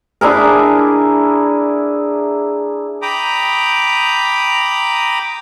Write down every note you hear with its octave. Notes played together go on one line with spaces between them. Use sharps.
D4 E4 G#4 A#4
G5 A#5 B5 D6 D#6